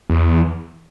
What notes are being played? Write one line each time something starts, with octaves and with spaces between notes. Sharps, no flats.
E2